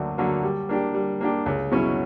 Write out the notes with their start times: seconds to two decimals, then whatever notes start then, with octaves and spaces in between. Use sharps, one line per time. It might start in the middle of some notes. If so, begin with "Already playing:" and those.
Already playing: D2 D3 F#3 A#3
0.18 D3 F#3 A#3
0.43 G3
0.69 A#3 D4 G4
0.94 G3
1.21 A#3 D4 G4
1.46 C#2
1.71 B2 F#3 C#4 E4